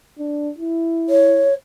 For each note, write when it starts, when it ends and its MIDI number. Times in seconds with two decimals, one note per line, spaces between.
0.19 0.50 62
0.58 1.48 64
1.09 1.54 73